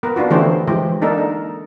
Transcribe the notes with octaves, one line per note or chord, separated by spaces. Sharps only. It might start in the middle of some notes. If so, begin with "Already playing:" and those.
B3 A#4 B4
B3 D4 F4 F#4
D3 E3 A3 C#4 G4 C5
E3 F3 G#3 G4
A#3 D4 D#4 A4 A#4
D#4